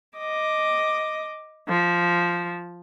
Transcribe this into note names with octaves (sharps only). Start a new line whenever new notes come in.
D#5 D6
F3